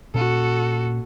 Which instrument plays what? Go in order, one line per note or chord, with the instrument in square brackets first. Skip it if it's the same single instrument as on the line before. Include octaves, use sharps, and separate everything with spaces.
[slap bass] A#2 C#4 [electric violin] F#4 A4